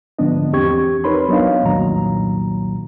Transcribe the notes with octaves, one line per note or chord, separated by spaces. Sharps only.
G#2 D3 F3 B3 D4 D#5
E2 C4 G4 C#6 G#6
D#4 A#4 B4 C#5 B5 C6
F#3 B3 D4 C#5 D#5 F5
C2 F2 A#2 D#3 F#3 A#5